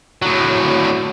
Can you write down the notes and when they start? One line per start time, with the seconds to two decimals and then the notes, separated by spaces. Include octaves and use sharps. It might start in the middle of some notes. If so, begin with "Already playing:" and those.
0.22 A2 F#3